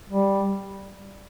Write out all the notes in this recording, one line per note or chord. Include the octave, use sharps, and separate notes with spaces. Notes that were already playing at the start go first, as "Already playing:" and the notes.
G3